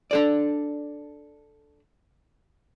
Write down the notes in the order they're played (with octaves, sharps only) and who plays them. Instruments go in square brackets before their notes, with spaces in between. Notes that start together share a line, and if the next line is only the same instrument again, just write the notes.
[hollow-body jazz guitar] D4 A4 D5